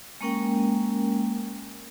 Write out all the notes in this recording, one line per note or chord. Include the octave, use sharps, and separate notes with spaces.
G#3 A#3 C#4 A#4 G5